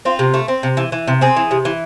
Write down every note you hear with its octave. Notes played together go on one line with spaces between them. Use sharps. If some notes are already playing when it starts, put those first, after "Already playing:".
C4 F4
C3
A3
C4
C3
E3
E3
C3
C4 G#4
E3
C3
E3